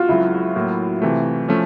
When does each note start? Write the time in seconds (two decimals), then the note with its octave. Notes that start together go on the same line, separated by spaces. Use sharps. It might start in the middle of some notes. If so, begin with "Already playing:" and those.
Already playing: F4 F#4
0.09 C#2 C#3 F#3 E4
0.56 A2 F#3 A#3
1.02 C3 E3 A3
1.49 F3 A3 C#4